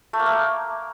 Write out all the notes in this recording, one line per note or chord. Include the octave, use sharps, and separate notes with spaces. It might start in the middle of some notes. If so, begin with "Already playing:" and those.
A3
A#3
A3
A#3